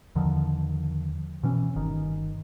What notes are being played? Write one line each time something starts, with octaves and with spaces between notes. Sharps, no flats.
E2 D3 D#3 F3
B2 E3 C#4
G1 D#3